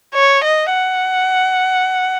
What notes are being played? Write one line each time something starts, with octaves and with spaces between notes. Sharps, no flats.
C#5
D#5
F#5